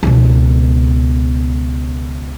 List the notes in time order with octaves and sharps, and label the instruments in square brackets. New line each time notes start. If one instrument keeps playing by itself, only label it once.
[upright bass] C#2 B2